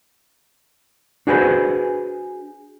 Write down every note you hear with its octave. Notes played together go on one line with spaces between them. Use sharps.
D4 F#4 G#4 B4 C5 B5